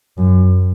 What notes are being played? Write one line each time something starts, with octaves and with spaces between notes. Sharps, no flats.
F#2